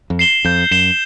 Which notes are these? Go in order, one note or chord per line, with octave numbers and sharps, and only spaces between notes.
F2
C7 E7 G7
F2 G6
F#2 C7 E7 G7